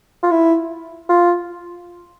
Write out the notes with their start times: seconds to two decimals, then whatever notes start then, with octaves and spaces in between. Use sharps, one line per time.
0.23 F4
0.31 E4
1.09 F4